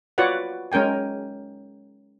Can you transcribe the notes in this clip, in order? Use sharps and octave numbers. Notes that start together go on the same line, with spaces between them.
F4 F#4 B4 C#5 D5 F#5
G#3 C#4 A#4 G5 G#5